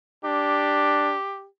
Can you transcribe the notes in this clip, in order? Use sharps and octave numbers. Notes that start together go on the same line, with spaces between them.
D4 G4